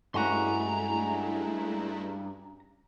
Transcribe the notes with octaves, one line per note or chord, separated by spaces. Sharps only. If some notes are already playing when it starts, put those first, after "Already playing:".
G2 G#3 A3 C#4 E4 F#4 A#5 C6